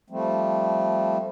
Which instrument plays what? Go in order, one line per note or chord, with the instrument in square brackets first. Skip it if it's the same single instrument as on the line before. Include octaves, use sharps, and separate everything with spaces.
[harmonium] F3 G3 A3 C4